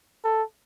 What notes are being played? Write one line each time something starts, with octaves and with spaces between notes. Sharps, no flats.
A4